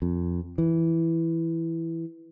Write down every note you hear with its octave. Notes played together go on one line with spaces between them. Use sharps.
F2
E3